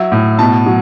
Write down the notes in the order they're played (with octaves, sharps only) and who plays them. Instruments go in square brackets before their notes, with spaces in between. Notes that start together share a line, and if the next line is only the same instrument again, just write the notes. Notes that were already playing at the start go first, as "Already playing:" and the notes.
Already playing: [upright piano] F#3 E5
A2
B2 A5
F#3